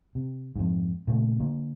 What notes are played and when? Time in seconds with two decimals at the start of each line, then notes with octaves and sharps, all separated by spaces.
0.15 C3
0.56 F2 G#2
1.07 A#2 C#3 A3
1.40 D3 A#3